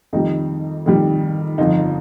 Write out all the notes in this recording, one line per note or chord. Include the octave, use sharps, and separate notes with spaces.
F2 D#3 G3 D#4
F2 D#3 G3
G1 F2 F3 D#4